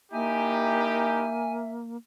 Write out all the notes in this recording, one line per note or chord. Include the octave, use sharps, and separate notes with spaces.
A#3 D#4 E4 G4 E5 G#5